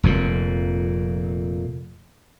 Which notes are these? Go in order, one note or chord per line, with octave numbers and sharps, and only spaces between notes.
F1 F2 A#2